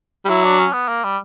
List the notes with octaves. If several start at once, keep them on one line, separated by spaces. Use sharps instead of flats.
G3
F#3 E4
D4
C#4
B3
A#3
G3